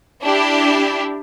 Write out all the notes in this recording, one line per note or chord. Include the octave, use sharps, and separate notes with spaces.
D4 E4 G4